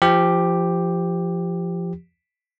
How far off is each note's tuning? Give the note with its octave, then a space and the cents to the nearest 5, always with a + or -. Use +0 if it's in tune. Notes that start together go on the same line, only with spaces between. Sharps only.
F3 -20 G4 +5